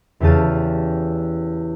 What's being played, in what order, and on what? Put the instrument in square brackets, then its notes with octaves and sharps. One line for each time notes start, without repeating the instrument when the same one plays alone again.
[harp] E2 C#3 G4 F5 A5 D#7